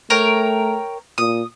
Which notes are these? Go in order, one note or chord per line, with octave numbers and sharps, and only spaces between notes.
A3 A#4 C#5 G5
A#2 D#6